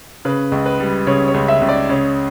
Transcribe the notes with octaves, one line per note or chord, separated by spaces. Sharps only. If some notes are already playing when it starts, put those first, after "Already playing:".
C#3 B4
C#2
B4
G3
C#3 C#5
C#5
C#2
E5
C#2
D5
C#3 C#5